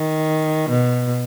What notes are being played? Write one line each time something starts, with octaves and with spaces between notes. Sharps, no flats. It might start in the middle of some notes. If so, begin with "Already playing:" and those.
Already playing: D#3
B2